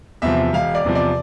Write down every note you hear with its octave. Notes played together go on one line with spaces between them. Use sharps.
E2 C3 F3 E5
E1 F5
D5
E2 C3 F3
D5